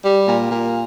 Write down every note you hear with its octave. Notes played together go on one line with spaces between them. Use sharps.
G3
A#2
A#2